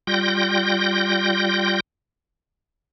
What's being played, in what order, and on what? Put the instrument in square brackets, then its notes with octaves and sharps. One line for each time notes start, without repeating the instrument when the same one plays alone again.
[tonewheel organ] G3 F4 G5 G6 A#6